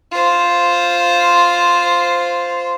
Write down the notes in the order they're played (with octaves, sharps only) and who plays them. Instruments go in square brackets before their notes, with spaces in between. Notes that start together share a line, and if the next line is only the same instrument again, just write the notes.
[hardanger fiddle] F4 C5